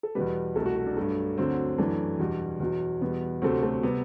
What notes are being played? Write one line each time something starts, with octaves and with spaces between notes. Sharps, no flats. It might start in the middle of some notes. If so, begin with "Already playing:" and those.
A4
E2 B2 G3 B4
C2 B2 F#3 A3 A4
F#4
F#4
D4
G2 F#3 A3
D2 D3 F#3 C4
F#2 E3 A3 D4
E2 B2 G3
E2 B2 F#3
E2 B2 G3 B3
D2 C3 F#3 A3 C4
A3
C3 G3 B3